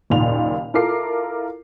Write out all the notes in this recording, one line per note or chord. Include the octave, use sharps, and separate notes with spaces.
F#1 D#2 A#2 F7
E4 F4 A4 A#4 D6 C7